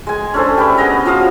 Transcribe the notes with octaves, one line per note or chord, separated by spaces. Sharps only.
G#3 G#5
C#4 D4 A4 C5
G4 B4 E5
B3 G#4 D#5 A#5
F3 F#3 F5 D#6